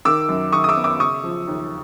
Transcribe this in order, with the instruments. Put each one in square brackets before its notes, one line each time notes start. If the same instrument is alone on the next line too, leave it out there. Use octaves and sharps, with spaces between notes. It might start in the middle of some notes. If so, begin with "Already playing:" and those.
[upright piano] D#3 D6 E6
F#2
D#3 C#6 D#6
D#6
D6 E6
B3
D6 E6
C#3 C#6 D#6
F3
D#2